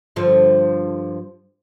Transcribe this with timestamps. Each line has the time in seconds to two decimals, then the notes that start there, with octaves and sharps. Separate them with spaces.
0.16 G2 D3 F3